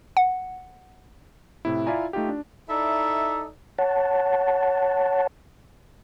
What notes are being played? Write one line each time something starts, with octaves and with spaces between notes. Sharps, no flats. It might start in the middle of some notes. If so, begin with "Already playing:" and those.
F#5
A2 C3 E4
E4 F4 D5 E5 G#5 A#5
A3 D#4 F4 G4
D4
D#4 E4 A4 D5 E5
C#5 F#5 A5